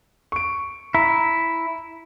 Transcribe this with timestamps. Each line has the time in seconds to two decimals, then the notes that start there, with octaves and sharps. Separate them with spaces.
0.32 C#6 D7
0.95 E4 A#5